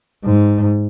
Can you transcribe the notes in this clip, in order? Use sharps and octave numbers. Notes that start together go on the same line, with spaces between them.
G#2